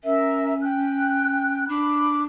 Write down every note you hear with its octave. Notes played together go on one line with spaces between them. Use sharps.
C#4 A#4 E5
G5 F#6
D4 B5 D6